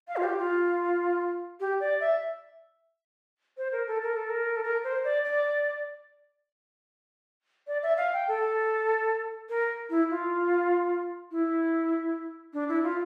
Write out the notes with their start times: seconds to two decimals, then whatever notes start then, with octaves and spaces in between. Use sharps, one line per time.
0.08 F5
0.17 F4
0.23 G4
0.38 F4
1.60 G4
1.80 D5
2.00 E5
3.57 C5
3.72 A#4
3.87 A4
4.03 A#4
4.16 A4
4.30 A#4
4.56 A4
4.64 A#4
4.84 C5
5.04 D5
5.25 D5
7.67 D5
7.83 E5
7.97 F5
8.13 G5
8.28 A4
9.49 A#4
9.90 E4
10.10 F4
11.31 E4
12.53 D4
12.69 E4
12.83 F4